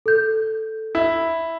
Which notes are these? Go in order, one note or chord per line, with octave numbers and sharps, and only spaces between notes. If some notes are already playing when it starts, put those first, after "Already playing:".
A4 G6
E4